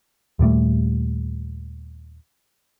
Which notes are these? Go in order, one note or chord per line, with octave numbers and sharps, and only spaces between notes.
D#2 A#2 G3 A3